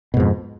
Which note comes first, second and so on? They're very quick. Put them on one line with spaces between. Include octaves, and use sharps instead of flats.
B2 G#2 F2